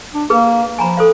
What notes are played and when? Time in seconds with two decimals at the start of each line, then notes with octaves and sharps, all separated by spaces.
0.14 D4
0.30 A#3 G#4 B4
0.79 F3 G#5 A#5 B5
0.97 A4 C5 F5